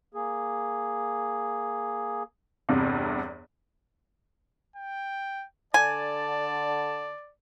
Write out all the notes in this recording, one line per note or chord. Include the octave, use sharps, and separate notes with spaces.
A#3 G#4
G1 E2 G2 C3
G5
D3 D5 G#5 A5